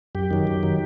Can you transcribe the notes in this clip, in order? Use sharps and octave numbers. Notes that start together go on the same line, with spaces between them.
F#2 G4
D#3 F#3
F#2
D#3 F#3